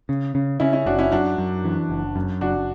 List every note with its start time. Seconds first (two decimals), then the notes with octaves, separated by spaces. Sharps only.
0.09 C#3
0.35 C#3
0.60 C#3 C#4 E4
0.73 C#4 E4
0.86 F#1 D4 F#4
0.99 C#4 E4
1.12 F#2 D4 F#4
1.38 F#2
1.64 E3
1.90 F#1
2.16 F#2
2.41 F#1 D4 F#4